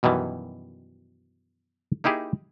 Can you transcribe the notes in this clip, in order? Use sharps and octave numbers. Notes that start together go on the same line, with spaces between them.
F#2 B2 D#3 E3 G3
A#3 D#4 E4 G4 G#4